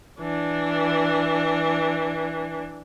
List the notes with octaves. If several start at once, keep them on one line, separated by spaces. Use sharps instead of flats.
E3 D4